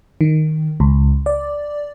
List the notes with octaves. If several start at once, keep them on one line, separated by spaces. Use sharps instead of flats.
D#3
C#2
D5